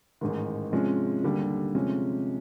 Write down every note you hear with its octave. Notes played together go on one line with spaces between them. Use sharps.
A1 G#2 D#3
C3 F3 G#3 C#4
D#2 D3 G3
C3 F3 G#3 C#4